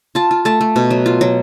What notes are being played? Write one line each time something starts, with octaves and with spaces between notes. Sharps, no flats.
F4 A5
F4
A3 A5
A3
B2
F#3
F4
F#3